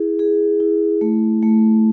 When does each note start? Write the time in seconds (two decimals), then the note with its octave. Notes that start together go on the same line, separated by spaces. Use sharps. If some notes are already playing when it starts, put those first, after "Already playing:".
Already playing: E4 G#4
0.19 G#4
0.60 E4
1.01 A3
1.43 A3